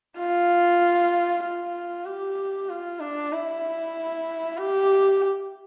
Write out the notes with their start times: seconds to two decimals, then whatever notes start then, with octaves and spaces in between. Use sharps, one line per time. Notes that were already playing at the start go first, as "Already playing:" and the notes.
0.18 F4
1.44 F4
2.05 G4
2.69 F4
3.00 D4
3.32 E4
4.58 G4